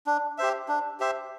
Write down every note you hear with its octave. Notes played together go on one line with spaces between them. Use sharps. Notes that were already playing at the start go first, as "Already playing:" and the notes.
D4
G4 C5 E5
D4
G4 C5 E5